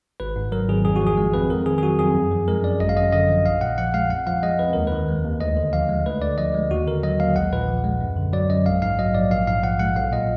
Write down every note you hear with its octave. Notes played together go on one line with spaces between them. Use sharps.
G#1 B4
G#2
F#3 A#4
G#1 G#4
F2 G#4
F#4
F3
G#4
G#3
F2 B4
F2 A#4
D#3 G#4
G#4
F#3 F#4
F2 G#4
F#2
F3
G#3 A#4
F#2 D5
G#1 D#5
F5
F#2 D#5
D3 D#5
F3
A#1 F5
A#2 F#5
F3 F#5
G#3 F5
F2 F#5
F3 F5
G#3 D#5
F2 B4
D#2 A#4
D#3 B4
G#3
D#2
D2 D#5
D3
F3 F5
G#3
D2 B4
D3 D5
F3 D#5
G#3
D#2 F#4
D3 A#4
F#3 D#5
D#2 F5
A#1 F#5
A#2 B4
F3
G#3
F#2
D3
F#3 D5
F#2 D#5
A#1 F5
G#2 F5
F#3 D#5
A#1 D5
A#1 F5
G#2 F5
F3 F#5
G#3 F#5
B1 F5
A#2 D#5